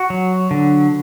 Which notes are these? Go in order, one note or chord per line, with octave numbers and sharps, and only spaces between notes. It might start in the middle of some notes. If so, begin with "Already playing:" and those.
Already playing: F#4
F#3
D3